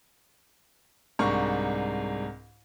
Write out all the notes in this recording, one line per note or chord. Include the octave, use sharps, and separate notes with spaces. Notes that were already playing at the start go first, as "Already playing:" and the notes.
C2 G#2 D4 A#4 C#6